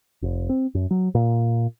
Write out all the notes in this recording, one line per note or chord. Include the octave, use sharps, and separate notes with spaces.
F1
C4
F#2
F#3
A#2